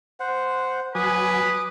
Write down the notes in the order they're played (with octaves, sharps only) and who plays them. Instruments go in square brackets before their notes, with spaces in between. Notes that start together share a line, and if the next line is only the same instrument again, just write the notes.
[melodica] C5 F#5
[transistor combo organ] F#3 G#5 [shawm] B4 [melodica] D6 D#6